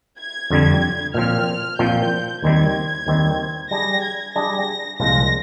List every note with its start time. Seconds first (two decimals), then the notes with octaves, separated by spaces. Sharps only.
0.19 G#6
0.50 F2 D3 G3
1.14 A#2 F3 C4 F6
1.78 A#2 F3 C4 G6
2.43 D#2 D#3 G3 C4 G#6
3.07 D#2 D#3 G3 C4
3.71 G3 D4 G#4 A#6
4.03 G#6
4.35 G3 D4 G#4 A#6
5.00 C2 A#2 F3 G#3 A#6